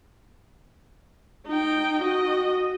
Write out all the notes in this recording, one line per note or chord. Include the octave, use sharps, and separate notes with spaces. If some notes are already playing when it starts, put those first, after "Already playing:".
D#4 G5
F#4 D#5